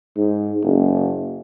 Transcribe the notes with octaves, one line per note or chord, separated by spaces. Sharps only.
G#2
F#1